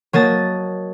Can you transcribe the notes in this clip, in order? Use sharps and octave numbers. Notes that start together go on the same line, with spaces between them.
F#3 A#3 D#5 A5 A6